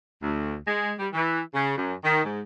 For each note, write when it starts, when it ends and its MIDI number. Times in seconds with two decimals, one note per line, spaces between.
0.22 0.55 38
0.67 0.92 56
0.99 1.10 55
1.13 1.41 52
1.54 1.76 49
1.77 1.94 42
2.04 2.21 51
2.24 2.41 44